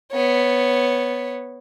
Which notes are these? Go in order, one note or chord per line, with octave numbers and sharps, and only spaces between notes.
B3 C#5